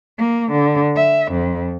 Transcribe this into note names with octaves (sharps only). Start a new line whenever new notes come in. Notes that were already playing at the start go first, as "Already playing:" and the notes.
A#3
D3
E5
F2